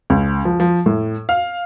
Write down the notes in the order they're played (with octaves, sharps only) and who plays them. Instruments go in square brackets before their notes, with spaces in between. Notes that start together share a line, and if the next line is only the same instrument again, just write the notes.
[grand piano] C#2
F3
F3
A2
F5